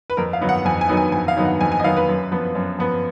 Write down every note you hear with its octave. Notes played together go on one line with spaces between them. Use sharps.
B4
F2 A#4
F5
D#3 F#3 B3 D#4
F#5
F2 G#5
G#5
D#3 F#3 B3 D#4
G#5
F2 G#5
F5
D#3 F#3 B3 D#4
F#5
F2 G#5
G#5
D#5
D#3 F#3 B3 D#4 F5
B4
F#2
F3 B3
F#2
F3 B3